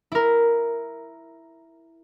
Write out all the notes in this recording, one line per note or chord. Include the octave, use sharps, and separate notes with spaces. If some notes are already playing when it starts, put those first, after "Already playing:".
E4 A#4